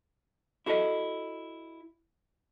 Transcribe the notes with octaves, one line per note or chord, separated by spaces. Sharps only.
E4 F#4 A4 A#4 D#5 E5